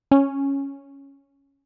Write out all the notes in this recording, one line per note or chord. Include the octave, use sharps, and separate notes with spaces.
C#4